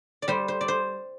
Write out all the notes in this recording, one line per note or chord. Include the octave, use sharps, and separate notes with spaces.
D5
G3 C5
C5
D5
C5